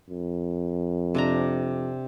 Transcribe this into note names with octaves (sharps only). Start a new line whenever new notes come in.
F2
C3 D4 A#5